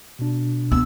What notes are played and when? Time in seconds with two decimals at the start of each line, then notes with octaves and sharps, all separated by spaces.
0.19 B2 D4
0.72 B3 E6